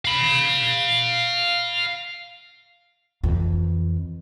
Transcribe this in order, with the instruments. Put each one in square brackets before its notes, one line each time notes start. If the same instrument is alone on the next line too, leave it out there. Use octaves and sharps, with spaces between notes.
[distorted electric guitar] F5 B5
[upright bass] F2 E3